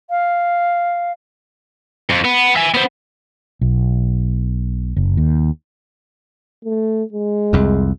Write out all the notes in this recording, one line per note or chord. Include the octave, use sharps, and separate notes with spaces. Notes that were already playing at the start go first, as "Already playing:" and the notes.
F5
F2
B3
E5 G#5
B3 C5
B1
F#1
D#2
A3
G#3
C2 F2